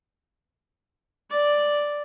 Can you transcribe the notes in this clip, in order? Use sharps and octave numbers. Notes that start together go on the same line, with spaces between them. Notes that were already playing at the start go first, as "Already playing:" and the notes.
D5